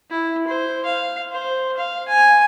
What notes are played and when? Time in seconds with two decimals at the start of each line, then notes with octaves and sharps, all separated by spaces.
0.11 E4
0.47 C5
0.85 F5
1.32 C5
1.78 F5
2.08 G#5